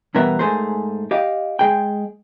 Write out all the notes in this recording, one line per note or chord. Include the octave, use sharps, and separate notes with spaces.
E2 G2 B2 B3 A#4 E5
G#2 A3 G#4 A#4 C5
G4 D#5 F5
G#3 G#4 G5